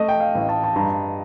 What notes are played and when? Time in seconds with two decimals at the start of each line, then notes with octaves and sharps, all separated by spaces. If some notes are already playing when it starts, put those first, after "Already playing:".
Already playing: A3 D#5
0.08 G5
0.20 F5
0.35 A1
0.49 A5
0.64 A5
0.76 G2 A#5